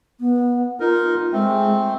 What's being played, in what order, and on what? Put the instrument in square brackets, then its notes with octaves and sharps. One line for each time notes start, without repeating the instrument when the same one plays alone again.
[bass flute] B3
[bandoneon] D#4 A#4 [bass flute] F4
[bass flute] G#3 [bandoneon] A3 C4